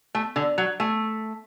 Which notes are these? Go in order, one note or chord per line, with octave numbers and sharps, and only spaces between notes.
A3
D3
F#3
A3